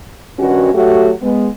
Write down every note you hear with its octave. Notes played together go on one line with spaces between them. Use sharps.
G2 D#3 C#4 F#4
F#3 A3 F#4 G4
G#3 B3